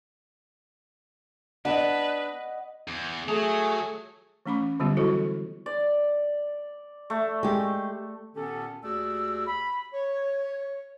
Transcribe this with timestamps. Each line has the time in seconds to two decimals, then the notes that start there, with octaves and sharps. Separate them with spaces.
1.65 B3 D4 B4 D5 D#5 F#5
2.88 E2
3.29 F#3 A3 G#4
4.46 E3 A3 C#4 B5 D6
4.80 D3 F#3 G3 B3 F4 G4
4.97 E3 E4 F#4 A4 C5 D#5
5.66 D5
7.10 A3
7.43 G#3 G4
8.35 A#2 D#3 B3 C#4 G4 A4
8.84 D#2 A3 F#4 G#4 D5 E6
9.47 B5
9.93 C#5